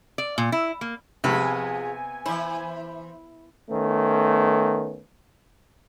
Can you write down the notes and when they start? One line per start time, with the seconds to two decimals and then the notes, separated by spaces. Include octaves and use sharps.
0.18 D5
0.38 A#2
0.52 E4
0.81 A#3
1.24 C3 F3 B3 G#4 B4 F5 G#5
2.26 E3 E4 C5
3.69 D#3 A3 B3 C#4